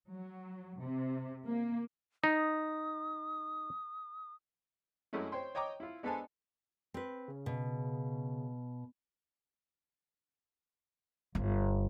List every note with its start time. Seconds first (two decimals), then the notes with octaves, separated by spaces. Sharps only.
0.12 F#3
0.81 C3
1.46 A#3
2.24 D#4 D#6
5.13 F#2 G#3 A3 C#4 E4
5.32 C5 C#5 G5 C6
5.55 C#5 D#5 G5 A#5 D6
5.80 E4 F4
6.03 G#3 B3 D4 A4 C5 G#5
6.94 C4 B4
7.28 C#3
7.46 B2
11.35 G1